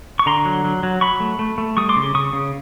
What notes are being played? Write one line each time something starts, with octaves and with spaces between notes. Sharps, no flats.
C#6
D3 A#5 C6
F#3
F#3
F#3
F#3 B5 C#6
A3
A3
A3
G3 C#6 D#6
C6 D6
C#3
C#3 C#6 D#6
C#3